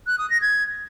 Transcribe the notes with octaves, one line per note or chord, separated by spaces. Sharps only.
F#6
D#6
A#6
G#6